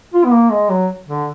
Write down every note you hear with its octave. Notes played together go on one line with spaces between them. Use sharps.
F4
B3
A#3
G#3
F#3
D3